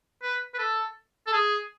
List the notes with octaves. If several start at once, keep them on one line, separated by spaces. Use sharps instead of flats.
B4
B4
A4
A4
G#4